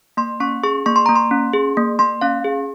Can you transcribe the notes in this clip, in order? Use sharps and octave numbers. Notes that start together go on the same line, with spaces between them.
A#3 C6
C#4 C#6
G#4 C#6
A#3 C#6
C6
A#3 A#5
C6
C#4
G#4
A#3
A#3 C6
C#4 F5
G#4